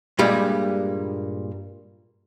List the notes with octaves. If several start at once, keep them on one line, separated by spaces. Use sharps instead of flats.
G2 A#2 G3 G#3